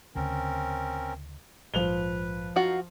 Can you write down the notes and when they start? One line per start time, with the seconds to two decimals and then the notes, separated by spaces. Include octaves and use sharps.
0.15 D2 C#3 C4 C#4 A#4
1.74 A#1 G#2 F3 B4 F7 G7
2.56 F#2 D#4 F4 F#4 F5